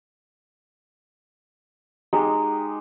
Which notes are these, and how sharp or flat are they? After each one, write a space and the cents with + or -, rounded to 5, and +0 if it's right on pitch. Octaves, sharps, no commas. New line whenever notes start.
G#3 +0 D#4 -10 G4 -5